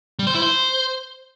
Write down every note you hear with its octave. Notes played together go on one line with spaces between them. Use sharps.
G3
C5
E4
C5